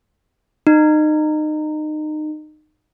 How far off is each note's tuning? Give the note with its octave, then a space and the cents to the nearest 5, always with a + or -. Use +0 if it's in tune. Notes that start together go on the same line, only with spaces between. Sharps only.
D#4 -25